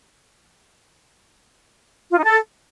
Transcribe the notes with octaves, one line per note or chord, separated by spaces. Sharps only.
F4
D#4
A4